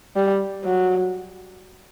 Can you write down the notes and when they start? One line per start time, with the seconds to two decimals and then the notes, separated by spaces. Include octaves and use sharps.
0.16 G3
0.65 F#3